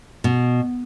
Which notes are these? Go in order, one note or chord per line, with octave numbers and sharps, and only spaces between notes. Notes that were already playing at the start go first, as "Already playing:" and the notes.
B2